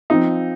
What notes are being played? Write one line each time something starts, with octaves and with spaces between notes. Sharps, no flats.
F3 C4 D#4 F4